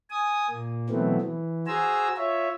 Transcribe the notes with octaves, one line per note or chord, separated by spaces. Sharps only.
G#5 D#6
A#2 A#3
B2 E3 F#3 A3 B3 C4
E3
F#4 G#4 C5 G#5 A#5 E6
F4 C#5 E5